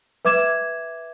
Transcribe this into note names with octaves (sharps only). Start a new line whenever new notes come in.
B4 E5 D6 G#6 E7